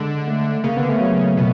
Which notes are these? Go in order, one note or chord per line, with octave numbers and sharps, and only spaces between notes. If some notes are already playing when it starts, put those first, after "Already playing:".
Already playing: D3 G#3
A3
C#3 A#3
D3 B3
C#3 A3
F#3
B2